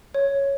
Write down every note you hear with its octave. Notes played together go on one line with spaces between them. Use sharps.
C#5